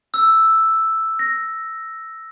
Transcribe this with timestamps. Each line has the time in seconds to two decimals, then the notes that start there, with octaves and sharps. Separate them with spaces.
0.14 E6
1.19 A#6